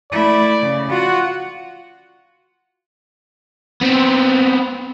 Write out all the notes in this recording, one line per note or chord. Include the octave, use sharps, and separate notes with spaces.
A3 E4 D5
C#3
F4 F#4 F#5
B3 C4